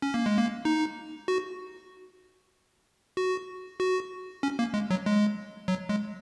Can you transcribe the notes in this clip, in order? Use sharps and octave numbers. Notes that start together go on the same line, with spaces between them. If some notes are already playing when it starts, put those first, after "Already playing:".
C#4
A#3
G#3
A#3
D#4
F#4
F#4
F#4
C#4
A#3
G#3
F#3
G#3
F#3
G#3